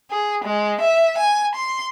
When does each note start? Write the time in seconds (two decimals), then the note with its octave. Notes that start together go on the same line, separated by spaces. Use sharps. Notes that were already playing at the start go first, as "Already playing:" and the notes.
0.10 G#4
0.44 G#3
0.81 E5
1.18 G#5
1.55 C6